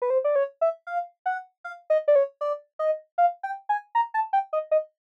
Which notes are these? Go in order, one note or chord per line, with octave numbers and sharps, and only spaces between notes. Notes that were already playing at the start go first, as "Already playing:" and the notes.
B4
C5
D5
C#5
E5
F5
F#5
F5
D#5
D5
C#5
D5
D#5
F5
G5
G#5
A#5
A5
G5
D#5
D#5